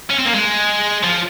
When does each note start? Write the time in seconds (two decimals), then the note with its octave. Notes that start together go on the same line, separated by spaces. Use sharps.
0.10 C#4
0.19 C4
0.25 A#3
0.34 G#3
1.03 F3